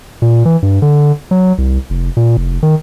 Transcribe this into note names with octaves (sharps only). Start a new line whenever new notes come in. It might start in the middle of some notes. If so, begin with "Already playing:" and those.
A#2
E3
G2
D3
F#3
C2
F1
A#2
F1
D#3